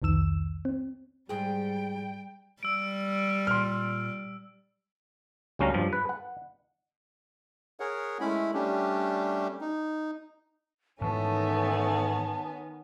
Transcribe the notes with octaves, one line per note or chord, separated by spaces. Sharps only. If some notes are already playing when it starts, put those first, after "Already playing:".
C2 F2 D#3 E6 E7
C4
G#2 G3 G#4 G5
G3 E6 D7
A#2 C6 F6
D2 G3 C#4 F5 A#5
G2 F3
B4
F#5
G#4 A#4 C#5 F#5
G#3 A3 C#4 E4 B5
G3 A3 C#4 D4 G4
D#4
G#2 D#3 E3 A3 B3 C#4 A5